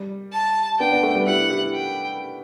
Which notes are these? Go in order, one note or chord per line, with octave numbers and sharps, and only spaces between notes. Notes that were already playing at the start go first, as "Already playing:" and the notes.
Already playing: G3
A5
B3 D4 G5
B3 D4
A3
G3 B3
E4 G4 F#5
E4 G4
G5